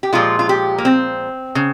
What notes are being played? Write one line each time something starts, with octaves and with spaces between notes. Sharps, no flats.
G4
A#2 F3 G#3 F4
F4
G4
A#3
C4
C#3